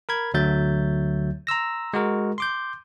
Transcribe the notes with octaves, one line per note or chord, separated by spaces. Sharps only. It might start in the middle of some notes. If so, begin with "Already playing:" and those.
A#4 B5 G#6
D2 D3 F#3 E5 G6 A6
A#5 C6 E6 A#6
G#3 F#4 A#4
C6 D6 G6